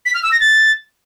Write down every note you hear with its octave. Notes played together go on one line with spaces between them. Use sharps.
B6
F6
E6
A#6
A6